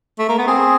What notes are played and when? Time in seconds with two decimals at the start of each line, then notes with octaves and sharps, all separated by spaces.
0.18 A3
0.29 A#3
0.38 B3
0.47 C4 G#4